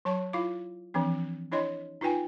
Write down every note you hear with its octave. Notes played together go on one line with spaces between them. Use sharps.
F#3 C#5 A5 C#6
E4 F4 F5 D6
E3 F3 C4 D4
D4 E4 C#5 D#5 C6
D#4 F4 B4 G5 G#5